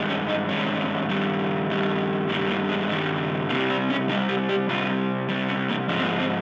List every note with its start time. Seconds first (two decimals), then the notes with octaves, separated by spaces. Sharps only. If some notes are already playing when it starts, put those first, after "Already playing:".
Already playing: G2 D#3 G#3
0.09 C#4
0.29 D#4
0.49 G2 D#3 G#3 C#4
1.09 G2 D#3 G3
1.70 G2 D#3 G3
2.29 G2 D#3 G3 A#3
2.49 A#3
2.69 G#3
2.90 G2 D#3 G3
3.49 C3 A#3
3.54 G3
3.70 C4
3.90 C#4
4.08 C3 D#4
4.12 G3
4.29 G4
4.49 G4
4.69 C3 G3 F4
5.29 C3 G3
5.49 C#4
5.69 A#3
5.89 G#2 F3 G#3 C#4
5.99 C4
6.04 A#3
6.20 C4